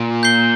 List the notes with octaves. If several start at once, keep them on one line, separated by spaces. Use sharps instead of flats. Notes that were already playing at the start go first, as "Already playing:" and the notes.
Already playing: A#2
G6 C7 G7